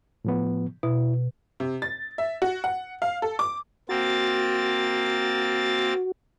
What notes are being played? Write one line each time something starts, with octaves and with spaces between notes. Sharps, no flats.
A2 F3 B3
B2 E4
C3
A6
E5
F#4
F#5
F5
A4
D6
A#3 C4 F#4 A6